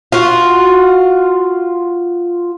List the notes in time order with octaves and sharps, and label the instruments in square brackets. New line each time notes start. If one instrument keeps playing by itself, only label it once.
[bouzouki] F4 F#4